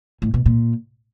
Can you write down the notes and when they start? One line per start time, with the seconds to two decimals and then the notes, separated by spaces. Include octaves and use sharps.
0.22 A2
0.34 B2
0.46 A#2